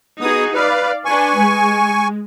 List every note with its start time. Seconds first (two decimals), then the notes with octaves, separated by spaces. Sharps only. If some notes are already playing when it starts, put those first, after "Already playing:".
0.21 B3 D#4 F#4 G#4 D#6
0.54 B4 D5 F5
1.05 D4 B4 G#5 C#6
1.38 G#3